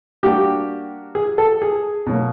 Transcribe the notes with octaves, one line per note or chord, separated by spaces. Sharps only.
G3 A#3 D4 F#4 G4
G#4
A4
G#4
B2 F#3 A#3